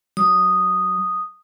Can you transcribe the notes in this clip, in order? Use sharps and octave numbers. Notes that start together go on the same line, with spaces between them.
F#3 D#6